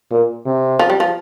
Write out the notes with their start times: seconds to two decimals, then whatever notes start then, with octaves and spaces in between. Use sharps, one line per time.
0.11 A#2
0.46 C3
0.79 F3
0.90 G3
1.00 F3